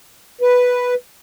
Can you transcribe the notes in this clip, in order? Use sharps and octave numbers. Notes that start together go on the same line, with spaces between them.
B4